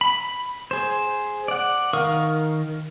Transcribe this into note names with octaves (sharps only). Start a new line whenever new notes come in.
B5
G#4 C5
D5 F#5
D#3 A#4 F5 C#6 D#6